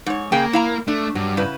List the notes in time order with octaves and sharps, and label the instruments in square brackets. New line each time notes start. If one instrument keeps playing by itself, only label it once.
[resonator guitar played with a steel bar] G#2 C#5
[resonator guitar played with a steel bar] C#3 G#4 G5 [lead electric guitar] A#3
[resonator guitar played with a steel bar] E4 F5 A#5
[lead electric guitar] A3 [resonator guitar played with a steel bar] D4
[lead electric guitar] G2 [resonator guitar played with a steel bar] F#3
[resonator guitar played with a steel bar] C#3 E4 B4